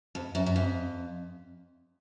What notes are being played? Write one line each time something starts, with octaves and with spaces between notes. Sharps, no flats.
F2
F#2
F#2
F2